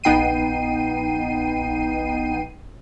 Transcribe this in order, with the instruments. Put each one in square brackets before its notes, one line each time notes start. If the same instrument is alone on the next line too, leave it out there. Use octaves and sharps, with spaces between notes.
[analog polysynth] A#1 B3 D#4 G5 C7 D#7